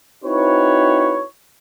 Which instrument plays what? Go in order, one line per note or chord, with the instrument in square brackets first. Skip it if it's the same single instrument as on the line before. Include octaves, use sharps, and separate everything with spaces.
[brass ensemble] C4 D#4 E4 F#4 B4 C#5